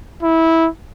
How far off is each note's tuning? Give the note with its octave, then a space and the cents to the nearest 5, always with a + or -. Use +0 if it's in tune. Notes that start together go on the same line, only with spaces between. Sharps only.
E4 -15